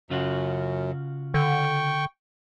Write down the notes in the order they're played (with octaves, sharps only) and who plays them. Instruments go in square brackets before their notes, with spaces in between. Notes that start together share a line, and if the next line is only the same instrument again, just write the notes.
[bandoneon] F#2 [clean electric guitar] C#3 F4 F#4
[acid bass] D3 [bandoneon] G5 C#6